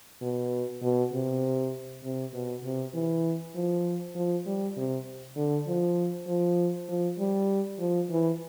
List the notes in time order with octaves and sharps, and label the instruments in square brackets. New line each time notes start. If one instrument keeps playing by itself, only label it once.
[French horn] B2
B2
C3
C3
B2
C3
E3
F3
F3
G3
C3
D3
F3
F3
F3
G3
F3
E3